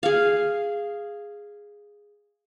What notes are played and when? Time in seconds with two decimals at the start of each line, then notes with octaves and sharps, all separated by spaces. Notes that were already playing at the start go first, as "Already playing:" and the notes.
0.03 G#4 F5